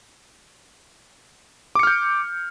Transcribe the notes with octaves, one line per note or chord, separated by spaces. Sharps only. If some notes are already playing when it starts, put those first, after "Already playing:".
D6 F6 G6 C#7